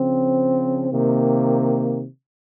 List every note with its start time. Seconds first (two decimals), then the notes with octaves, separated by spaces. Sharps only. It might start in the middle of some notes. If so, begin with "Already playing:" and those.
Already playing: C#3 F3 C4
0.90 C3 D#3 A#3